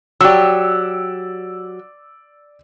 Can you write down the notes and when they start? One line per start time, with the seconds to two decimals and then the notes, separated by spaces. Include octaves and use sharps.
0.21 F#3 G4 D5 E6